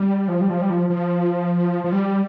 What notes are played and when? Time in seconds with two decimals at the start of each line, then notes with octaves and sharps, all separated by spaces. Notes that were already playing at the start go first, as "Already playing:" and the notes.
Already playing: G3
0.28 F3
0.41 G3
0.49 F3
0.62 G3
0.70 F3
0.90 F3
1.84 F3
1.92 G3